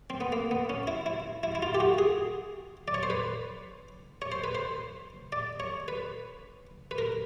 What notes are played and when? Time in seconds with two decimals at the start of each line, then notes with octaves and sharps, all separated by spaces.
0.10 C4
0.21 B3
0.32 A#3
0.51 B3
0.70 C#4
0.87 E4
1.06 E4
1.43 E4
1.55 E4
1.62 F4
1.75 G4
1.80 F#4
1.98 G#4
2.88 D5
2.94 C#5
3.03 C5
3.10 B4
4.22 C#5
4.32 C5
4.44 B4
4.55 C5
5.32 D5
5.60 C#5
5.88 B4
6.91 B4
6.98 A#4